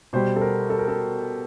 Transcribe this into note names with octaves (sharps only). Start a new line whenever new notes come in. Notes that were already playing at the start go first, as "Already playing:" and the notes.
B2 G3 C5
A4
A#4
A4
A#4
A4